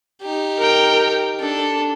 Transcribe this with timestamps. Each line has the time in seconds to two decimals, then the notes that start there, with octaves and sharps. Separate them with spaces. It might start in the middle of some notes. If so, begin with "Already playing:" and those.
0.22 D#4 G4
0.59 A#4 G5
1.40 D4 A4